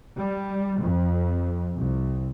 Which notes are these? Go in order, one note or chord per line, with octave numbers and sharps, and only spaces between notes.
G3
F2
C2